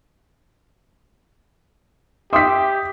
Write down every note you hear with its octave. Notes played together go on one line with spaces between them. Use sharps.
G4 E5 C6 D6 D#6 B6